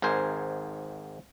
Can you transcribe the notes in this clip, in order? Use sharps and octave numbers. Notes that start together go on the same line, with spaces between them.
G#1 G#2 A#4 C5 G#5